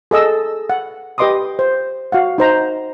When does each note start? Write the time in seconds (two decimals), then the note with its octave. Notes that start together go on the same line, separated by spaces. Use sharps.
0.11 G#4 A4 D#5 E6
0.70 F#5
1.18 G4 B4 D#5 C6 D6 D#6
1.59 C5
2.12 F#4 F5 F#5
2.38 D#4 C5 A#5